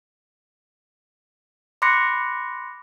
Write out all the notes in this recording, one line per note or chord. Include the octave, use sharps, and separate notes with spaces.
B5 C6 D6 F#6 A#6 C#7